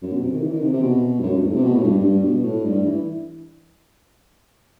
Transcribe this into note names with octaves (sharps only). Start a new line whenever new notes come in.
F#2
B2
C3
D#3
E3
D#3
C3
C3
B2
G2
F#2
G2
A2
C3
B2
A2
G2
G2
B2
A2
G2
E3